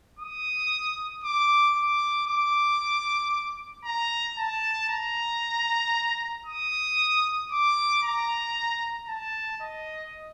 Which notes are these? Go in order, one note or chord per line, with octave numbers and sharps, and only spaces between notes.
D#6
D6
D6
D6
A#5
A5
A#5
D#6
D6
A#5
A5
D#5